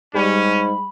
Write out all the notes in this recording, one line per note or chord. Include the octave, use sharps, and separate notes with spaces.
G#2 G3 C#4 G4 B5